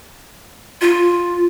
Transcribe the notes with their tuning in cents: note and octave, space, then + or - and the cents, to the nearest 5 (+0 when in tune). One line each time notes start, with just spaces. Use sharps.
F4 +5